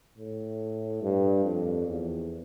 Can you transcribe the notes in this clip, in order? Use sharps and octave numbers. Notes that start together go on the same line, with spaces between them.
A2
G2
F2
E2